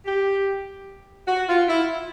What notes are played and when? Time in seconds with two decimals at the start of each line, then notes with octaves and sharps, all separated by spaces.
0.05 G4
1.28 F#4
1.49 F4
1.68 E4